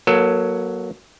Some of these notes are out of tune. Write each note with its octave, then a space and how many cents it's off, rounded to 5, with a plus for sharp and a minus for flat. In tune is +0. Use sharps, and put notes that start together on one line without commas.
F#3 +0 A#3 +30 A4 +25